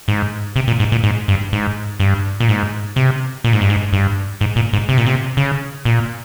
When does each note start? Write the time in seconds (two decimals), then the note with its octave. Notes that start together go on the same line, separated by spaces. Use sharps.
0.08 G#2
0.56 C3
0.68 A#2
0.80 G#2
0.92 A#2
1.04 G#2
1.28 G2
1.53 G#2
2.00 G2
2.40 A#2
2.48 G#2
2.96 C3
3.44 A#2
3.53 G#2
3.61 G2
3.70 G#2
3.93 G2
4.41 G#2
4.56 A#2
4.73 G#2
4.89 C3
4.98 A#2
5.06 C3
5.37 C#3
5.85 A#2